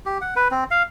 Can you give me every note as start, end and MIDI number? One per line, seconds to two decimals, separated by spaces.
0.06 0.18 67
0.21 0.34 78
0.36 0.48 71
0.51 0.64 60
0.71 0.83 77